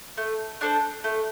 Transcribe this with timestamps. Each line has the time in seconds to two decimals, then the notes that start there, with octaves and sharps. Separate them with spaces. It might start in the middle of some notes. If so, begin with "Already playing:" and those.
0.17 A3
0.61 D4 A4 C5
1.04 A3